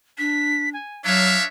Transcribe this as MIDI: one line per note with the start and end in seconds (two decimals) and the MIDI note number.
0.18 0.74 62
0.18 0.69 95
0.73 1.04 80
1.05 1.36 54
1.05 1.46 62
1.05 1.46 73
1.05 1.46 76
1.05 1.43 77